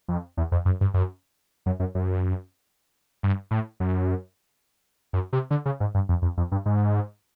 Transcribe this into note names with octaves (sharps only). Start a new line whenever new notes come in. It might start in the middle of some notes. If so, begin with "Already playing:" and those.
F2
E2
F2
F#2
G2
F#2
F#2
F#2
F#2
G2
A2
F#2
F#2
C3
D3
C#3
G#2
G2
F2
F2
F2
G2
G#2